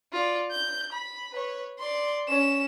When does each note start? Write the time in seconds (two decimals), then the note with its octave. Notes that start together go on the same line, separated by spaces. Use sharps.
0.13 F4 D5
0.51 G6
0.91 B5
1.32 B4 C#5
1.79 D5 C6
2.28 C#4 E7